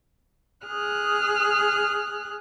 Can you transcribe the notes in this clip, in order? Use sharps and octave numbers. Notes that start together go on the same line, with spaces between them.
G#4 D#6 F6 F#6